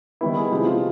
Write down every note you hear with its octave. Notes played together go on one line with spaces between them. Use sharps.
D#3 G3 B3 E4
G#4
C3 F3 G#3 G4
F4